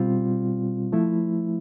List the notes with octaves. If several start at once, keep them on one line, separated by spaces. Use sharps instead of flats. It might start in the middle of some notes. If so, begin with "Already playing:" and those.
Already playing: B2 G3 C4 F4
F3 A3 E4